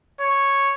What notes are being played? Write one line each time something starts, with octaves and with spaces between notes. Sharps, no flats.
C#5